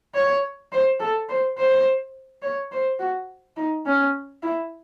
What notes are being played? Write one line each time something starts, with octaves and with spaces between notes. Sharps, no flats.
C#5
C5
A4
C5
C5
C#5
C5
F#4
D#4
C#4
E4